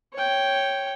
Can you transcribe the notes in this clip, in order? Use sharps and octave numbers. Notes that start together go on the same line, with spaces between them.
C#5 G5